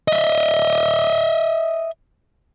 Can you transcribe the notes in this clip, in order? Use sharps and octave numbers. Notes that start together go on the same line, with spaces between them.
D#5 E5